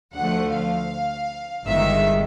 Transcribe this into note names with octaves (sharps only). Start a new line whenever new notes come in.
D2 D3 F3 A3 F#5
F5
G1 G2 D#3 G#3 E5